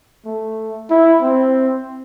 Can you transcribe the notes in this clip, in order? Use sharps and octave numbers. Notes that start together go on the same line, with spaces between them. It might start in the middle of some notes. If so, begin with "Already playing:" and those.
A3
E4
C4